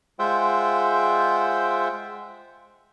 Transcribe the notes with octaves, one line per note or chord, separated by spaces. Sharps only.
G#3 F4 C5 E5 F#5 G5